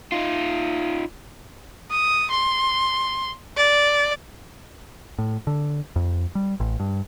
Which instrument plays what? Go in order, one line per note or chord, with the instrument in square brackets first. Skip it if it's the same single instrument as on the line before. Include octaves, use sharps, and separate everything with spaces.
[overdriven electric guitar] D#4 F4
[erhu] D#6
C6
D5
[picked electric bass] A2
D3
F2
G3
A1
G2